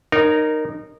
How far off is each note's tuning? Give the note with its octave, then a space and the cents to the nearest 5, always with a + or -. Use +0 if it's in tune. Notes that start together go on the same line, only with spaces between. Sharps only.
D#4 -20 A#4 +0 C#5 +0